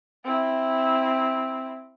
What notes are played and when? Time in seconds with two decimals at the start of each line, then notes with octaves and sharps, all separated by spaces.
0.24 C4 E4